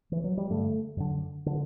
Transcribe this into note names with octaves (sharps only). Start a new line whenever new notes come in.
E3
F#3
G3
G2 D3 A3
F#2 D3
D3